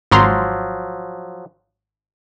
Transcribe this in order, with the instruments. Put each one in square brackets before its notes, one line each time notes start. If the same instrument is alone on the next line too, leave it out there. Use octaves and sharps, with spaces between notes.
[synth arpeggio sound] G#1 A#5 C6 [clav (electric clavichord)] F3 F#3